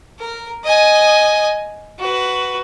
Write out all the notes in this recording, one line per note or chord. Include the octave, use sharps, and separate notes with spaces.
A#4
D#5 G#5
F#4 B4